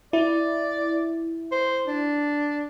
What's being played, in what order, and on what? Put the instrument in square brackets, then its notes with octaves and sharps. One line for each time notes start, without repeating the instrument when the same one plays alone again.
[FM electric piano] E4 [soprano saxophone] D5
[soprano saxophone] C5
D4